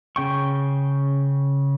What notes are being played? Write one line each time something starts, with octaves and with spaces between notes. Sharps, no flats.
C#3 G5 C#6